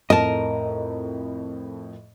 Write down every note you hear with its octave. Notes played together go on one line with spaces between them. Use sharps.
F2 A2 A#4 D#5 A5